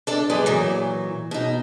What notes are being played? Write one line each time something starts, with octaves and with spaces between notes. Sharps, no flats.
D4 A4 D5
F#2 G#3 G#4 B4 D5
A#2 E3 F#3
B2 D#4